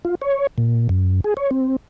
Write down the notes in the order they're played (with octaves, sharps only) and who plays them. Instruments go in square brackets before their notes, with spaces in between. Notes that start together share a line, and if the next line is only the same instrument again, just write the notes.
[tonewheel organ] F4
C#5
A#2
F#2
G#4
C#5
C4